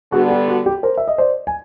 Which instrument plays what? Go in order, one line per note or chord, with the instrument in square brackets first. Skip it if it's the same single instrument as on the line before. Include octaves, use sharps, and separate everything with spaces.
[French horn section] D3 G3 B3 [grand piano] F#4 G#4
[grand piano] G4
F#4
G4
A#4 C5
E5
D#5
C5 D5
G#5